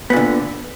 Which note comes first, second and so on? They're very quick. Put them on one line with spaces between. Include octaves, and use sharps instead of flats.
B3 A#2 D3